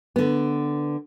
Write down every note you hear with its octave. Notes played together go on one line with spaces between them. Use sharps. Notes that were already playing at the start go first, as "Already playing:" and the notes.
D3 B3